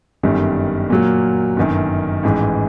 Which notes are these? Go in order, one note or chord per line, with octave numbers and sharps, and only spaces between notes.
G1 F#2 D#3 G3
A#2 F#3 A#3
G1 F#2 D#3
A1 G#2 E3